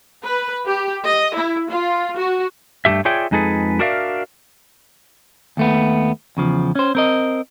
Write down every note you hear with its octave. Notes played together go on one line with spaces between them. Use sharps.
B4
G4
D#5
E4
F4
F#4
G2 G#3 A3 G4 E5
F4 G#4 C#5 D5 E5 G5
F2 G#3 D#4 G#4 A4 B4
D4 F#4 A#4 D5 E5 F5
D#2 A3 B3
E2 C#3 F3
C#4 C5
C4 A#4 D#5